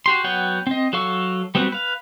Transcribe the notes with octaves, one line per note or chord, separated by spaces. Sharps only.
F#4 G4 C6
F#3 B3 C#5 F#5 G5
C4 D#5
F#3 A4 F5 C#6 E6
G3 B3 C4 F#4
B4 F5